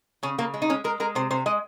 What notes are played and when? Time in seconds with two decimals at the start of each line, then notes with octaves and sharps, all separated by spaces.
0.23 C#3 C#4
0.38 C#3 A#3
0.54 G#3
0.62 D#4
0.69 G#3 C#4
0.84 G#3 A#4
1.00 G#3 A#4
1.15 C3 C5
1.30 C3 C5
1.46 G#3 D#5